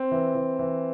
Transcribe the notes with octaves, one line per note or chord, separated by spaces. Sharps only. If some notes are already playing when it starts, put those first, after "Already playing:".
Already playing: C4
E3
E3
E3